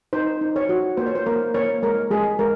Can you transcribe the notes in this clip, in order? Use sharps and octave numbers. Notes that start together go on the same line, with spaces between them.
D#4 C5
D#4
C#5
F#4
A#3 C5
C#5
C5
A#3 A#4
A#3 C#5
G#3 A#4
G#3 G#4
G#3 A#4